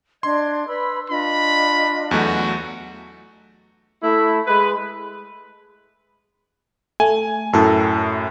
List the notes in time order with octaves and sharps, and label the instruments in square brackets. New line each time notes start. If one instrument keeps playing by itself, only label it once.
[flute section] D4 D#5 G#6 [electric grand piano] C6
[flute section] B4 B5 E6
[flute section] D4 F4 D#5 [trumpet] B5
[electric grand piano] E2 F#3 A3 [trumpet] F#4
[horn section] A3 E4
G#3 B4
[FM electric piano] A3 [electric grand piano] G#5
[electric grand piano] F#2 A2 [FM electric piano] E4 A4 A#4